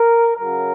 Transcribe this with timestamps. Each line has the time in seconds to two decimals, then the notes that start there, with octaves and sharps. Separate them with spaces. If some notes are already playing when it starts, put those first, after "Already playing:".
Already playing: A#4
0.38 C#3 F#3 A#4